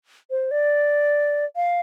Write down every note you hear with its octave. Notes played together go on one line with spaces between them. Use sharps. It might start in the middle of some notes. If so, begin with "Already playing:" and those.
C5
D5
F5